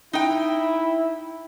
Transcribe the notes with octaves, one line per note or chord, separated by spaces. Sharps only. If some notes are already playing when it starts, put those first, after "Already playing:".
D#4 E4 G5